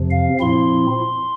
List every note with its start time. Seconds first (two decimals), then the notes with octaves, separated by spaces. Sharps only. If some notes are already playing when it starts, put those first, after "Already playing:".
Already playing: F2 C3 F3
0.11 F5
0.40 A#2 F3 C4 E4 C6